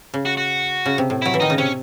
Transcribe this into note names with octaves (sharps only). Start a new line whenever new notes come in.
C#3
F#4
F#4
C#3
C3
A2
F#3 E4
E3
D#3 D#4
C#3
C3 C#4